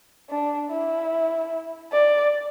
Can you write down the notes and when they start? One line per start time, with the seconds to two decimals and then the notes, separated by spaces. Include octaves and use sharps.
0.30 D4
0.70 E4
1.92 D5